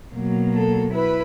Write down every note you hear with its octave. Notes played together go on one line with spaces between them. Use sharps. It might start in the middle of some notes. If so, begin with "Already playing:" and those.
B2 F#3 A#3
A4
E4 B4